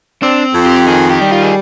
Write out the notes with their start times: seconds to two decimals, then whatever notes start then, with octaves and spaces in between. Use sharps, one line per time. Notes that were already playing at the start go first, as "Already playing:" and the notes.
0.22 C4 D4
0.55 F2
0.66 G4
0.87 D#3 G#4
1.10 G4
1.21 G3
1.32 F4
1.43 G#4